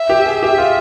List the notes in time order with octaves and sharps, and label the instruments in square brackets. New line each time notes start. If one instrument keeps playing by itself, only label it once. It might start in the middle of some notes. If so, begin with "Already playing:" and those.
Already playing: [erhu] E5
[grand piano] G4
G#4
[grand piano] G4 [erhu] E5
[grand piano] F4